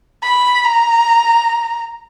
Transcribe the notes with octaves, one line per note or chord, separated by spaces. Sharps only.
B5
A#5